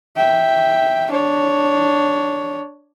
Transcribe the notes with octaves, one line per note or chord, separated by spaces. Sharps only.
E5 G5
D4 C#5